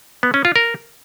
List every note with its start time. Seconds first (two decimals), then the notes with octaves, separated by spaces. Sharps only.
0.23 B3
0.34 C#4
0.45 F4
0.56 A#4